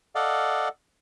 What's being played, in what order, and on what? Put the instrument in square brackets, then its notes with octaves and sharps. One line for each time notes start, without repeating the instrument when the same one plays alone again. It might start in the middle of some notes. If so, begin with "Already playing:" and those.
[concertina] A4 D5 D#5 F5 F#5